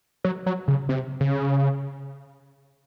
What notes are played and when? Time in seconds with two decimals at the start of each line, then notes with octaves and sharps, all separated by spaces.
0.24 F#3
0.46 F#3
0.68 C#3
0.89 C3
1.21 C#3